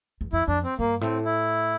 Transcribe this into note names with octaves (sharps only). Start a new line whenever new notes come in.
E2
F2 E4
F2 D4
C4
G2 A#3
A2 C4
E4